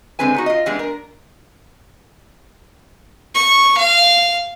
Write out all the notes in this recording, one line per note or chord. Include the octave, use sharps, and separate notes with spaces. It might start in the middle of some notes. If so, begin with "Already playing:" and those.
D3 G#3 C4 B4 G#5
B3 D#4 F#4
F4 D#5
E3 G3 G#3 B3 D4
A#4
C#6
F5